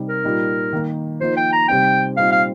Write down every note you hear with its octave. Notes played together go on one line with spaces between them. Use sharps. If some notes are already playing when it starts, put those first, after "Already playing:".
Already playing: C3 G3 D#4
A#4
A#2 G3 D#4
D#3 A#3 D#4
F3 A#3 D#4 C5
G5
A#5
C3 G3 C4 D#4 G5
A#2 G3 C4 D#4 F5
F5